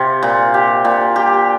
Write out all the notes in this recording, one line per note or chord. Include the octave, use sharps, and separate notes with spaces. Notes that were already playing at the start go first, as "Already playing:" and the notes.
Already playing: C3 F4
A#2
G4
A#2
G4